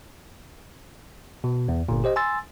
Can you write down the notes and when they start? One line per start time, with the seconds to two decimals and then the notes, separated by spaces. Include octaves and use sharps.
1.44 B2
1.68 E2
1.89 G1 A#2
2.04 G4 C5 D#5
2.16 G#5 C6 E6 A6